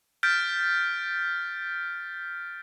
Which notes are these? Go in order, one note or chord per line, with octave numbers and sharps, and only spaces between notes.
F6 G6 A6 B6 D7